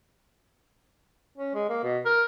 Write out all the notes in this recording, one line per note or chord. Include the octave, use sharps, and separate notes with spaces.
C#4
G#3
A#3
B2
A#4